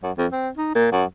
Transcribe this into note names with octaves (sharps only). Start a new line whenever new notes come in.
F#2
F2
C4
D#4
A#2
F#2